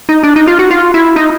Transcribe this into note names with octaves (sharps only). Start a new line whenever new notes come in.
D#4
D4
D#4
F4
F#4
F4
E4
D#4